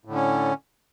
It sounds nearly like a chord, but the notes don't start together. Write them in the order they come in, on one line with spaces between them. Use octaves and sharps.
A2 D3 C#4